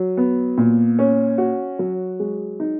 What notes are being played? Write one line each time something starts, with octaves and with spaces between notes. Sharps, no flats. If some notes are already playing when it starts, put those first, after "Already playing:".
Already playing: F#3
B3
A#2
C#4
F#4
F#3
G#3
D#4